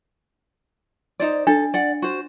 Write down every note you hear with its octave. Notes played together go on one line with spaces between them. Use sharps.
D#4 C5 D5
D4 A4
D5 F#5
F#4 C5